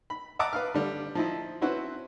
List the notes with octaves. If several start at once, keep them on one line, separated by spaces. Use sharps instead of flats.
B5
E5 F#5 A5 A#5 D6 D#6
B4 F5 F6
D3 G3
F3 D#4 E4
C4 C#4 E4 F#4 B4 C5